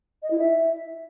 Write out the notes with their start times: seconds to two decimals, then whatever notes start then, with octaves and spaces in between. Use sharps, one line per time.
0.23 D#5
0.31 E4
0.39 E5